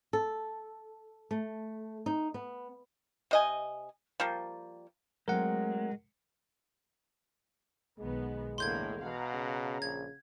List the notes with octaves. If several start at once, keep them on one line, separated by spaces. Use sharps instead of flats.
A4
A3
D#4
B3
C3 D#5 G#5
F3 G3 A#3
F#3 G#3 A3 C4 A#4 F#5
B1 D#3 G#3 B3
E2 A2 D3 A#3 C6 G6 G#6
B2 F5 F#5 A#5
C#3
A#1 G#6